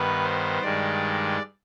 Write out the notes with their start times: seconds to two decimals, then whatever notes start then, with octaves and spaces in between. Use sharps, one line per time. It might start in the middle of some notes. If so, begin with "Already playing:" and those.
Already playing: G2 D#3 B3 B4
0.23 C5
0.62 G2 D#3 G#3 D5